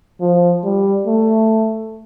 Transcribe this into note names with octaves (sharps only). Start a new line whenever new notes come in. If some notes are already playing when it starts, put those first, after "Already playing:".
F3
G3
A3